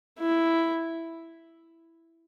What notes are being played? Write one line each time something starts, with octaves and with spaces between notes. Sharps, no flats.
E4